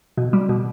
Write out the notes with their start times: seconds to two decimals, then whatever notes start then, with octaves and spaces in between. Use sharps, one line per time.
0.17 B2
0.33 G3
0.49 B2